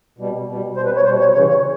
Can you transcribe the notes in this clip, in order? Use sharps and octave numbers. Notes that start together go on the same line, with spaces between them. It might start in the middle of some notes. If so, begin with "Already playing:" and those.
B2 G3
B2
G3
B2 G3 C5
B4
C#5
B2 G3 C5
C#5
C#3 E3 G3 C#5
C#5